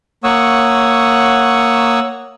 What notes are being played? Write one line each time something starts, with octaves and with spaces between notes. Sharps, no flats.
A#3 C#5 F#5 C#6 D#6 E6